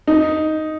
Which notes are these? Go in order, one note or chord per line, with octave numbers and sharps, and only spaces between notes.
D#4